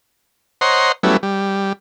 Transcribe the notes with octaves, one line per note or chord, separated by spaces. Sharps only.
C5 C#5 D#5 F#5 A#5 C6
F#3 G3 A3 B3 C#4 E4
G3